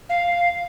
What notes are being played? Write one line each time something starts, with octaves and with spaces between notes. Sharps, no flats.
F5